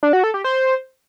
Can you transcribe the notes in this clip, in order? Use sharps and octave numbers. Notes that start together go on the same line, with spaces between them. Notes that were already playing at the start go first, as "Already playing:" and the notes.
D4
F#4
A4
G4
C5